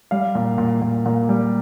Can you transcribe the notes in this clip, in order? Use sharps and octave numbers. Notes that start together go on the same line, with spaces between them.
G3 F5
A#2
A#2
A#2
A#2
G3